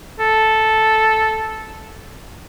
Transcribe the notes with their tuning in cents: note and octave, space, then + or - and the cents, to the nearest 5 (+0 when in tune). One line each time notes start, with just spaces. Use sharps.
A4 -5